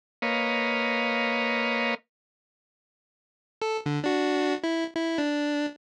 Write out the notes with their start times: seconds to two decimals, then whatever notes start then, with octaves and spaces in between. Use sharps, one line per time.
0.22 A#3 B4 C#5 D#5 F5
3.62 A4
3.86 D3
4.04 D4 F#4
4.64 E4
4.96 E4
5.18 D4